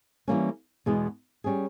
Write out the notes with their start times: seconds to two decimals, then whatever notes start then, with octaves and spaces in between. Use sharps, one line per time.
0.28 E3 G3 A#3 C#4
0.86 E2 B2 G#3 B3
1.44 G3 C#4 G#4